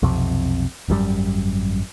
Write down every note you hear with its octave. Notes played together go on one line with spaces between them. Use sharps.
B1 F2 C3
G#1 F#2 D#3 G3